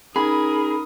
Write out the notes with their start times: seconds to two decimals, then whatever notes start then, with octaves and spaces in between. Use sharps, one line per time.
0.16 C#4 D#4 G#4 A#4 B5 D#6